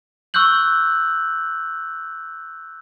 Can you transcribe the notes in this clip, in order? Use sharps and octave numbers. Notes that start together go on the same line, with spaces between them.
C#6 E6 F#6 G6 F#7